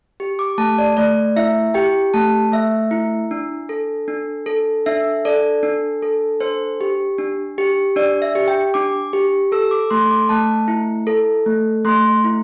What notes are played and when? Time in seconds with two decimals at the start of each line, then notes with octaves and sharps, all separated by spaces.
0.20 G4
0.39 D6
0.58 A3 A5
0.78 D5
0.97 A3 D5
1.36 E4 E5
1.74 G4 G5
2.14 A3 A5
2.52 A3 E5
2.91 E4
3.31 D4
3.69 A4
4.08 D4
4.46 A4
4.86 D4 E5
5.25 A4 D5
5.63 D4
6.02 A4
6.41 D4 C5
6.81 G4
7.18 D4
7.58 G4
7.96 D4 D5
8.22 E5
8.35 G4
8.48 G5
8.74 D4 D6
9.13 G4
9.52 A4 E6
9.71 D6
9.91 A3 C6
10.11 D6
10.29 A3 A5
10.68 E4
11.07 A4
11.46 A3
11.85 A3 C6
12.24 E4